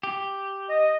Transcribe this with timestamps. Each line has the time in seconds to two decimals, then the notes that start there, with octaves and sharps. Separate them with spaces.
0.03 G4
0.69 D#5